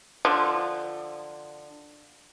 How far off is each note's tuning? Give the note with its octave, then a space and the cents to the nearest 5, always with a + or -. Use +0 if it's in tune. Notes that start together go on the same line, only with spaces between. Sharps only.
D3 +15 F3 +0